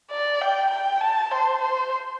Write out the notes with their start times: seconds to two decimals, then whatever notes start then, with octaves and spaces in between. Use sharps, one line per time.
0.11 D5
0.41 G5
0.71 G5
1.01 A5
1.31 C5
1.61 C5